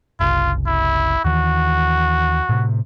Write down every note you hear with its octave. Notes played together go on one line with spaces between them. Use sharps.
F#1 C2 F4
E4
D#2 D#3 E3 F#4
A2 C3